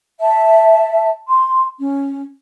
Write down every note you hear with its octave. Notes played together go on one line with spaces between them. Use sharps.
E5 A5
C6
C#4